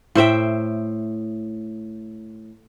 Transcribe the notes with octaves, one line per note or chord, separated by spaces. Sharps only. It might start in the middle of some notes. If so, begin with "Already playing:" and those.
A2 C5 E5 G5